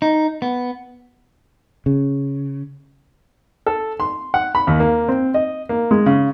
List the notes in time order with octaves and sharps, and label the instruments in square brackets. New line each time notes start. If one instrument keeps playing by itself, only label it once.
[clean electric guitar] D#4
B3
[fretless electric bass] C#3
[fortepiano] A4
C6
F#5
B5
D#2
A#3
C4
D#5
A#3
G#3
C#3